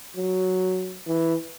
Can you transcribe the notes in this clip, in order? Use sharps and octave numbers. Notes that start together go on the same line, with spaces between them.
F#3
E3